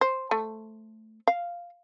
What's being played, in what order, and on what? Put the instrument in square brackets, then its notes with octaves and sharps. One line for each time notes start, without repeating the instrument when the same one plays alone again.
[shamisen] C5
A3
F5